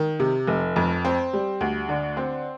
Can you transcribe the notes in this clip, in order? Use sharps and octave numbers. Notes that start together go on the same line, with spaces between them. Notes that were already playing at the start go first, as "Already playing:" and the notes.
Already playing: D#3
C3
F1
F2
C4
G3
D2
D3
C4